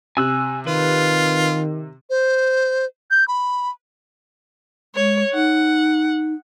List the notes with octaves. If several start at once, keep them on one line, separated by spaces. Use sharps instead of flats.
C3 G#5 E6 F#6
D#3 F4 B4
C5
G6
B5
G#3 C#5
D#4 F#5